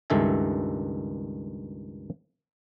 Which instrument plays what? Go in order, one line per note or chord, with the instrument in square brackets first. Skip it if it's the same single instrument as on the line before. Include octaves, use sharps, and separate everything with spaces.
[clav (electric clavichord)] C#2 G2 D#3 A4 E5 G#5